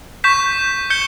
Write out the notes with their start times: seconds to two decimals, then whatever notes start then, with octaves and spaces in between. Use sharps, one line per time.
0.24 C#6 G6 B6 E7
0.90 G6 C#7 G7